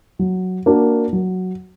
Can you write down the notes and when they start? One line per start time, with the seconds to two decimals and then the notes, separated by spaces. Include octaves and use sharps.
0.19 F#3
0.66 A#3 D4 F#4
1.13 F#3